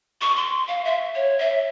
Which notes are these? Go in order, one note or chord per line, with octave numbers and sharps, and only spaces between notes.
C#6
C6
F5
E5
C#5
E5